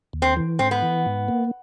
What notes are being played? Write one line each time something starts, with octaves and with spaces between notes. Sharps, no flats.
D#2
C4
E3
G#2 C4
B3
E3
G#2
A#3